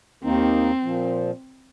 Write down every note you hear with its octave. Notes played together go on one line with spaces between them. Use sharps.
D#2 D#3 A#3 C4 D#4
A#2 F3